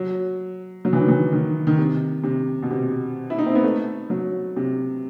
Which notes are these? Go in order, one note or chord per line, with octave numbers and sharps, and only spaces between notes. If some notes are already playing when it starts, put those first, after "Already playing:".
Already playing: F#3
F#3
E3
D#3
E3
D#3
D#3
C3
C3
B2
C3
E4
D#4
C4
B3
A3
F#3
C3